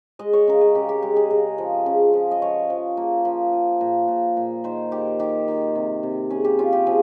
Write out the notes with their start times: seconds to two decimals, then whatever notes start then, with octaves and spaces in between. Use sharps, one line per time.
0.19 G#3 D#5
0.33 C#5
0.47 C#3 A#4
0.61 G#4
0.75 C#3 G4
0.89 G4
1.02 G#3 G4
1.16 G#4
1.31 C#3 A#4
1.58 F3
1.86 C#3
2.13 F3
2.31 D#5
2.42 F3 C#5
2.70 F3
2.97 A#3
3.25 F3
3.53 F3
3.81 A#2
4.08 A#2
4.37 A#2
4.64 D#3 C5
4.92 D#3 G4
5.19 D#3 G4
5.48 D#3
5.75 C3
6.03 C3
6.30 C#4 G#4
6.44 G4
6.59 C#4 F4
6.72 G4
6.87 F3 G#4